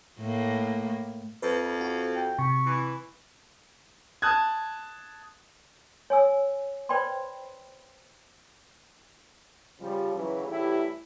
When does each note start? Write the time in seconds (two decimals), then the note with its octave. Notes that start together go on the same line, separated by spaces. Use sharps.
0.20 A2 A#3
1.42 F2 B4
1.81 F#4
2.15 G5
2.39 C3 C#6
2.66 E3
4.22 A5 D#6 F#6 G#6
6.10 C#5 G#5 E6
6.89 B4 C5 D5 G5 B5 C6
9.80 C#3 F3 G3
10.14 C#3 E3 F#3
10.46 A2 E3 G3 E4 G4